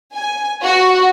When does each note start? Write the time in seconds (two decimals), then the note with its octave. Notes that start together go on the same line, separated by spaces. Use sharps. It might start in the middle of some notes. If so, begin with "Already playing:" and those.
0.15 G#5
0.63 F#4